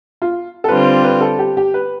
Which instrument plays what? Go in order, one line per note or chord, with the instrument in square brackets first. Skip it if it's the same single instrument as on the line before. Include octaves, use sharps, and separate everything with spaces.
[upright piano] F4
A4
[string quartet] D3 G3 C4 F4 [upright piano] B4
[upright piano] B4
A4
G4
G4
B4